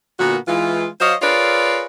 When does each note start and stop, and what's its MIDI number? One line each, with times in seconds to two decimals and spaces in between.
0.19 0.37 46
0.19 0.37 50
0.19 0.37 58
0.19 0.37 59
0.19 0.37 66
0.48 0.87 52
0.48 0.87 56
0.48 0.87 65
1.01 1.14 54
1.01 1.14 72
1.01 1.14 73
1.01 1.14 75
1.01 1.14 77
1.22 1.86 65
1.22 1.86 68
1.22 1.86 70
1.22 1.86 71
1.22 1.86 73
1.22 1.86 74